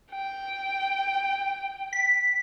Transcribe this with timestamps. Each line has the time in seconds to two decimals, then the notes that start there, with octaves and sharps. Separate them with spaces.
0.12 G5
1.93 B6